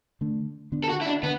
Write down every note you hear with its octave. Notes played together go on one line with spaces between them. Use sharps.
D3 A3 D4
D3 B3 D4
A4
F#4
E4
D4
D3 B3